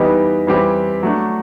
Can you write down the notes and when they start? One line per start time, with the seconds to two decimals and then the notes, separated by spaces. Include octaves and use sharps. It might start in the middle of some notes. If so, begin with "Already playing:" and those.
Already playing: E3 G3 B3 D#4 G4
0.47 E3 G3 C4 E4 G4
1.03 F#3 A3 D4